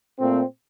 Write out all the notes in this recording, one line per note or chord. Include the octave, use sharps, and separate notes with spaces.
A#2 A3 C4